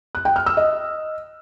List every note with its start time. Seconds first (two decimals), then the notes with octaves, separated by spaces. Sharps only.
0.15 F#6
0.25 G5
0.36 F6
0.46 E6
0.57 D#5